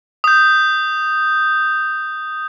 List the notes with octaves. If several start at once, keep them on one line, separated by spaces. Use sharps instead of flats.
D#6 G6